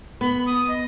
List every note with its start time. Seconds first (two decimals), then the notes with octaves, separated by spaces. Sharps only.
0.21 B3 B5
0.47 D#6
0.68 D#5